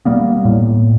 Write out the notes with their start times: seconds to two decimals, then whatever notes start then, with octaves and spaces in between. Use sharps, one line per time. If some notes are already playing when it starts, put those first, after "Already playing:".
0.05 B2 G3 A#3 B3
0.45 A2